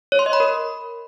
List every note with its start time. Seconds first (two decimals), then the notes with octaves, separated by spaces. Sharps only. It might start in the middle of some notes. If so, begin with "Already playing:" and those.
0.12 C#5
0.19 C6
0.26 D#5
0.33 B5
0.40 A#4